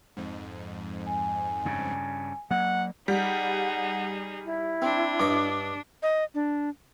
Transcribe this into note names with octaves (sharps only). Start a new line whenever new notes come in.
F2 G#2
G#5
G2 C#3
F#3 A#3 F#5
G3 D#4 G#4 F#5
E4
C4 D4
G2 C#5 D#5 D6
D#5
D4